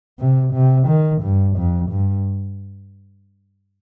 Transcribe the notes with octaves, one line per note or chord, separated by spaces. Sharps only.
C3
C3
D#3
G2
F2
G2